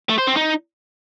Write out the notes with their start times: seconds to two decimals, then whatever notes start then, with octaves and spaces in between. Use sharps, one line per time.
0.09 A3
0.18 C5
0.27 C4
0.36 D#4